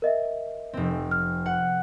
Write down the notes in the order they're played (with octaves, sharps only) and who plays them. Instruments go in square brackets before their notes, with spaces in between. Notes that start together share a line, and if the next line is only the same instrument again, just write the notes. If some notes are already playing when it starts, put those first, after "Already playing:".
[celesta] A#4 D#5 E5
[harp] F1 C4
[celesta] F6
[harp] F#5